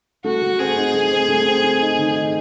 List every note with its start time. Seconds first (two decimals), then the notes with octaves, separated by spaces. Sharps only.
0.24 A3 F#4
0.42 A3
0.59 C4 G#4
0.77 D#4
0.95 A3
1.11 C4
1.29 A3
1.46 C4
1.64 A3
1.81 D#4
1.98 D#3
2.16 D#4